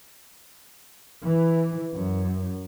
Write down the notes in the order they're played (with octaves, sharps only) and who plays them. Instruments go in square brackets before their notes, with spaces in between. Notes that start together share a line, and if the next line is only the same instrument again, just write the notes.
[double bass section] E3
F#2